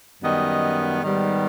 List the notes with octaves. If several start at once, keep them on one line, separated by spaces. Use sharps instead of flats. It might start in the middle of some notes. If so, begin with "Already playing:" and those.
F#2 D#3 G3 B3 D#5
G#2 D#3 G3 B3